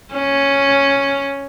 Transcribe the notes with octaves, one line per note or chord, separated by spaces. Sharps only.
C#4